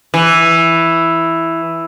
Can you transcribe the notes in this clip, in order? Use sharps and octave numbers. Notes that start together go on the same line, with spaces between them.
E3